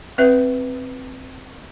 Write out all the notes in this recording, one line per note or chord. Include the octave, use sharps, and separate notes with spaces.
C4 B4 E5